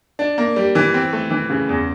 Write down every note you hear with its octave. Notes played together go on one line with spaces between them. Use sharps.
D4
A#3
G3
E3
C4
A3
E3
C#3
E2